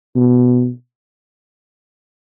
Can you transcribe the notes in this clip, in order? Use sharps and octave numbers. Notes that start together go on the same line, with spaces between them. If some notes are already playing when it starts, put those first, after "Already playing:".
B2